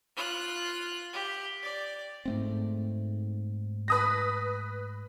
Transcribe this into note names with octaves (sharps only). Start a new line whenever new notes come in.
F4 F#6
G4
D5
G#2 A3 C4
B4 D#6 A#6